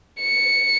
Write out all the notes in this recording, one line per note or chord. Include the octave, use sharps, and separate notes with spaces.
C#7